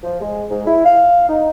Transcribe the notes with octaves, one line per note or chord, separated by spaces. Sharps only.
F3
G#3
G#2
E4
F5
D#4